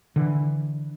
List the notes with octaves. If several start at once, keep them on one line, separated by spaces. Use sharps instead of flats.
D3 E3